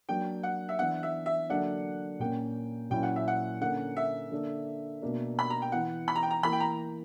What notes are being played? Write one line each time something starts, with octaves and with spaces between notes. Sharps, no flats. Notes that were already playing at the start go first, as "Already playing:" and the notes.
F#3 A#3 D4 G5
F#5
E5
E3 B3 D4 F#5
E5
E5
D3 F#3 A#3 D4 F#5
A#2 A#3 C#4 G5
A#2 F#3 C#4 E4 G5
F#5
E5
F#5
D3 A#3 C#4 F#5
E5
D3 A#3 D4
B2 A#3 D4
B5
A#5
G5
E3 B3 E4 F#5
B5
A#5
G5
A#5
E3 A#3 E4 B5
G5
A#5